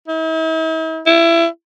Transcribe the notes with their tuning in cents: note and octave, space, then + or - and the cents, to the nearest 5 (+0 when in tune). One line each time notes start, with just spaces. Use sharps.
E4 -45
E4 +25